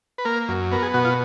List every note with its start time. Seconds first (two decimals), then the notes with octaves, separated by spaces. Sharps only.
0.18 B4
0.25 A#3 A#4
0.49 F#2
0.72 B3 A#4
0.83 G#4
0.94 B2 F#4
1.05 F4